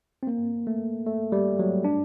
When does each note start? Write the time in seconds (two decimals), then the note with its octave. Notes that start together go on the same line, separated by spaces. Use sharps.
0.23 C4
0.27 A#3
0.67 A3
1.06 A3
1.32 G3
1.59 F#3
1.84 D4